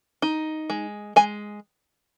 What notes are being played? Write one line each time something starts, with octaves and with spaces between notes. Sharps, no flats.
D#4
G#3
G#3 G#5